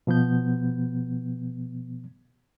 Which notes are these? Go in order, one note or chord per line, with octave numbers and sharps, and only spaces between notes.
B2 F3 B3 G6